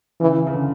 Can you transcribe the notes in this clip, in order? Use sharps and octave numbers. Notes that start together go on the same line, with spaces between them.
C#3 E3
C#3
D3